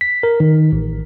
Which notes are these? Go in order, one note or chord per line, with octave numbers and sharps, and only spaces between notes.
B6
A#4
D#3
A1